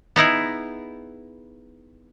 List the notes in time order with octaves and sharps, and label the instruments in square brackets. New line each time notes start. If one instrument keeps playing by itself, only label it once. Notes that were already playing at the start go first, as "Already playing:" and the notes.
[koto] B3 D#4 E4 G#4